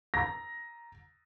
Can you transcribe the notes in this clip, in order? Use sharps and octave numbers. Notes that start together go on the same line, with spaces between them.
A#5 A#6